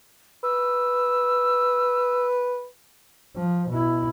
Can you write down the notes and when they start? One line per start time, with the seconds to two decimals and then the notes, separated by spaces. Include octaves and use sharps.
0.43 B4 E6
3.36 F3
3.69 B2 E4